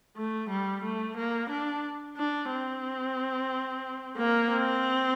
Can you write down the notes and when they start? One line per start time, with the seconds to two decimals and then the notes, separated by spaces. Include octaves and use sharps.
0.16 A3
0.49 G3
0.83 A3
1.17 A#3
1.49 D4
2.16 D4
2.50 C4
4.17 A#3
4.50 C4